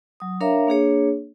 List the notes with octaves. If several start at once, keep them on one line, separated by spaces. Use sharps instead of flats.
F#3 D#6
D4 A#4 C#5 E5 F5 A#5
A#3 D4 G#4 C#5